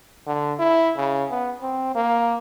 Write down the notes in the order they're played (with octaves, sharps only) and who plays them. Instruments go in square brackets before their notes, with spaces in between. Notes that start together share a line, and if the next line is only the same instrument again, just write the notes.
[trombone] D3
E4
C#3
B3
C4
A#3